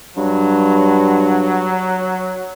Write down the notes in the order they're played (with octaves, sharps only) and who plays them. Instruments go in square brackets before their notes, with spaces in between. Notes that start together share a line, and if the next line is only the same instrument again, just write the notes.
[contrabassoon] G2 [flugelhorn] F#3